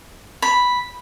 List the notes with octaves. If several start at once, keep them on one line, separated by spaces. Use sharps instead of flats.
B5